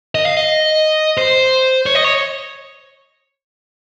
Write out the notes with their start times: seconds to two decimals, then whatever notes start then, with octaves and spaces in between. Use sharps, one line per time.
0.15 D#5
0.26 F5
0.37 D#5
1.18 C5
1.86 C#5
1.95 D#5
2.04 C#5